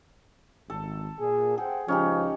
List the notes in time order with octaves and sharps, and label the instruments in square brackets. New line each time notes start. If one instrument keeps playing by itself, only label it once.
[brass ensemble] G#1 [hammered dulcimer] A4
[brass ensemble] A#2 G#4
[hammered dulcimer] G#4 [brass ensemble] C5 F#5 G5
[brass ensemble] C#2 F3 [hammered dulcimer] C#4 D#4 G4